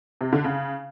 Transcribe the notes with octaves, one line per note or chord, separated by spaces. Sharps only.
C3
D3
C#3